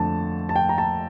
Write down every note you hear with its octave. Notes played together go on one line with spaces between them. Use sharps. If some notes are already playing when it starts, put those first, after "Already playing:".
Already playing: F2 D3 A3 A5
A5
G5
A#5
A5